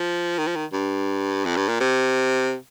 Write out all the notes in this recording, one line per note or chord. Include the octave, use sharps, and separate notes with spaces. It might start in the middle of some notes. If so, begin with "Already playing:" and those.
Already playing: F3
D#3
F3
D#3
G2
F2
G2
A#2
C3